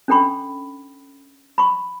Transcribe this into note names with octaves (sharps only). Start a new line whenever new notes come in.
C#4 D4 A4 G5 B5 C#6
B5 C#6